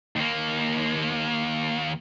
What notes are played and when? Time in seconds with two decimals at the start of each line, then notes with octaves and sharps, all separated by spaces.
0.16 D#2 A#3